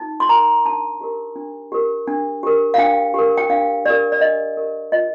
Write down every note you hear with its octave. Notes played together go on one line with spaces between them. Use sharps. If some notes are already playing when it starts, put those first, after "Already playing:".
Already playing: D#4
C6
A#4 A#5
D4 A5
G4 A#4
D4
G4 A#4
D4
G4 A#4
F5
D4 G5
G4 A#4
G5
D4 F5
G4 A#4 D5
D5
D4 D#5
G4 A#4
F4 D#5